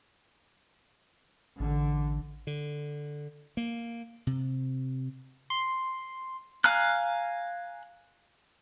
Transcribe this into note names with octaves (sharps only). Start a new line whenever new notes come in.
A1 D3
D3
A#3
C3
C6
F5 G#5 A#5 F6 F#6